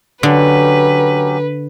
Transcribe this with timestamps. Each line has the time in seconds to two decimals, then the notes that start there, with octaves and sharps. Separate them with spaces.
0.23 D3 F#3 C#4 G4 B4